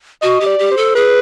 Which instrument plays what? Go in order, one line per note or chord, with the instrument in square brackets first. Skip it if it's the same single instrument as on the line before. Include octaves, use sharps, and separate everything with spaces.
[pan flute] F#4 [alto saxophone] D#5
[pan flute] G4
[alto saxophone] D5
[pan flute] G4
[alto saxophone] C5
[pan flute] A4
[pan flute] G#4 [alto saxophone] B4